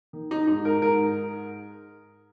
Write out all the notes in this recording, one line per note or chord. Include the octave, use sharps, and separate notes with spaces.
D#3
D#4
G#2 D#4
A#4
G#2 A#4